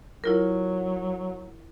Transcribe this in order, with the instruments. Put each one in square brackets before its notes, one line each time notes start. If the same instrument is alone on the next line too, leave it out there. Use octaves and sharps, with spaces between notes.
[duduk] F#3 [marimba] E4 F4 A#4